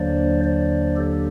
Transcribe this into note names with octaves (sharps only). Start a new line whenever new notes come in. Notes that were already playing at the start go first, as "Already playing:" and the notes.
Already playing: D#2 D3 F#3 A#3 D4 C5 D5
C5 D5
G4 A4